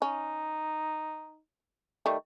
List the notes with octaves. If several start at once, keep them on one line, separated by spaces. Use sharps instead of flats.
C#4 D#4
D#3 G3 A3